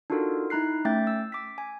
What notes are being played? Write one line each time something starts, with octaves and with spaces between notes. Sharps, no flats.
D4 D#4 F4 F#4 A4 A#4
D#4 E4 A#5 F#6 C7
A3 C#4 E5 G5 G6 A6
E6
D6 B6
G#5